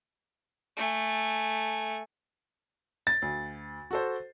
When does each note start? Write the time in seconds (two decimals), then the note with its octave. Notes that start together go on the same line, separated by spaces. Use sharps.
0.77 A3 G#5
3.07 A6
3.22 D2
3.91 F#4 A4 C5